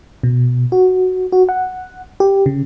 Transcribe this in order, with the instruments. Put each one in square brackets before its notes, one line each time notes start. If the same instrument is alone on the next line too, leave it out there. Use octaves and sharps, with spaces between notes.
[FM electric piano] B2
F#4
F#4
F#5
G4
C#3